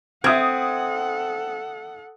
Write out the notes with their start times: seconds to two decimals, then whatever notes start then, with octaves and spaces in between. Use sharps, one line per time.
0.24 C4 A4 E5 F#5 D#6 G#6